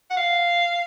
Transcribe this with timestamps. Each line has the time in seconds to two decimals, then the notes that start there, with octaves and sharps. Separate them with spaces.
0.10 F#5
0.17 F5